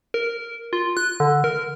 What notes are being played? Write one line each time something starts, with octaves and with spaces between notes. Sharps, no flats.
A#4
F4
F#6
D3
A#4